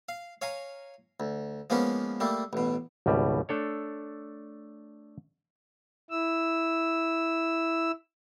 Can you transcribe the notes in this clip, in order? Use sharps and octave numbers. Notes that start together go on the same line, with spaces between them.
F5
C#5 F5 G#5 A#5
D2
F3 G#3 A#3 B3 C#4
G3 A3 A#3
A1 B2
G#1 C#2 B2 G3
A3 D4 A4 C#5
E4 E6